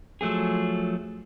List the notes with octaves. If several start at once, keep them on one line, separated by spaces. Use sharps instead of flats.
F3 F#3 A3 B3 G#4